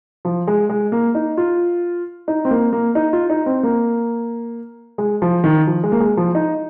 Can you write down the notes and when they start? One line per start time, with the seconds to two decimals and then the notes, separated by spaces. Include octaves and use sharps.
0.25 F3
0.47 G#3
0.69 G#3
0.92 A#3
1.15 D#4
1.37 F4
2.28 D#4
2.45 C4
2.51 A#3
2.73 A#3
2.95 D#4
3.13 F4
3.30 D#4
3.46 C4
3.63 A#3
4.98 G#3
5.22 F3
5.44 D#3
5.67 F3
5.83 G#3
5.92 A#3
6.00 G#3
6.17 F3
6.35 D#4